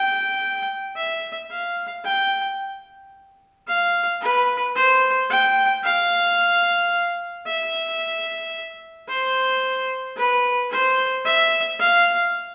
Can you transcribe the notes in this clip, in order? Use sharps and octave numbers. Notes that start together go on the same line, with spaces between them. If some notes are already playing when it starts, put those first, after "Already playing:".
Already playing: G5
E5
F5
G5
F5
B4
C5
G5
F5
E5
C5
B4
C5
E5
F5